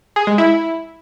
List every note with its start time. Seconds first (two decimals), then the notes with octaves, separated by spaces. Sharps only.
0.16 G#4
0.27 G#3
0.38 E4